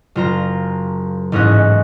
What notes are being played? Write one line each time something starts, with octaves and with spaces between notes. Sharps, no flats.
F#1 F4 A#5
A1 G#2 C#4 D#5 F#6